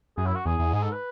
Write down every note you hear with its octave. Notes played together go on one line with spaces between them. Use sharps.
F#2 G#4
E4
F#4
E2 G#4
E2
G#2 G#4
A4
B4